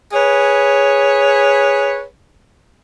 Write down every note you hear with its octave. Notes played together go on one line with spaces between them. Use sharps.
G#4 B4 C#5